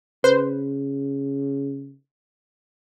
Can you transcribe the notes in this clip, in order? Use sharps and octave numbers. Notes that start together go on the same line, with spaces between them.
C#3 B4 C5